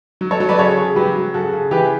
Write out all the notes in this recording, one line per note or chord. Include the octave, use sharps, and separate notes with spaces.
F#3
A4 C#5
F#3
B4 D5
C#3 A4 C#5
C#3
F#3 G4 B4
F#3
C#3 F#4 A4
C#3
E3 G4 B4